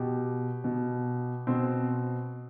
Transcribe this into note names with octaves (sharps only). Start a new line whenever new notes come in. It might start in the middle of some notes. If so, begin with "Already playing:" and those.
Already playing: B2 G4
B2
B2 C4